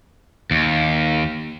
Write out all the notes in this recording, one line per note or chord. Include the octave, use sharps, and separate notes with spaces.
D#2